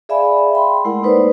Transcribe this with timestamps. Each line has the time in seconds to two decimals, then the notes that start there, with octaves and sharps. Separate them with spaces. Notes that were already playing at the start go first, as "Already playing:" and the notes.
0.09 G#4 D5 E5 F5 G#5 B5
0.53 G5 B5 C6
0.85 G#3 A3 E4 A#4 F#5 C6
1.03 A#3 D#4 B4 C5 D5